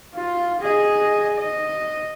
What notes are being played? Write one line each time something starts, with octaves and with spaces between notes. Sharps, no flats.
F4
G#4 D#5
D#5